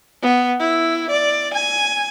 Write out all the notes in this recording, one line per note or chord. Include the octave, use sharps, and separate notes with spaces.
B3
E4
D5
G#5